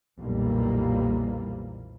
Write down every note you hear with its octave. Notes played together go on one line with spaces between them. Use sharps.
B1 F2 A#2 E3 G3 A#3